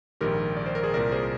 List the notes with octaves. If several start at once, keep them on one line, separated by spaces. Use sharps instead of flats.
A#1 G#2 D#3 G4 A#4
D5
C5
A#4
G#4 C5
C2 A#2 A#4 D5
G#4 C5